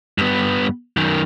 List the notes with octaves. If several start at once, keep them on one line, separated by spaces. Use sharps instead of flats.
G2 B3
F#2 D#3